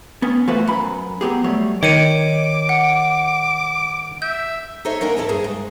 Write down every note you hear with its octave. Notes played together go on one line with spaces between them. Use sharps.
B3 C#4
E3 A3 F4 F#4 B4 C5
F#2 B5
F#3 B3 G4 G#4
F#3 G3 A3 C#5
D#3 C#5 D6 C#7 D#7
F#5
E5 G6
D#4 A4 C5 C#5 D#5 E5
A#3 C#4 D#4 A#4 F#5
F2 A2 E4 A4 A#5
G2 A#3 G#4 C5
G#2